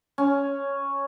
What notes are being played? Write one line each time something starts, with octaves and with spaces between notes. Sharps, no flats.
C#4